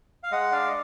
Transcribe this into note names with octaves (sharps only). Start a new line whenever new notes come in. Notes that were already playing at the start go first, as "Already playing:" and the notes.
F5
G#3 D#5 F#5
D4 D5 F5
D#5